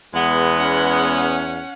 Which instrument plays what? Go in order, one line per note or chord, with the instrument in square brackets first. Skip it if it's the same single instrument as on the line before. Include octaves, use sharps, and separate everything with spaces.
[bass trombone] E2 [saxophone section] G#3 B3
[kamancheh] C#4 F#5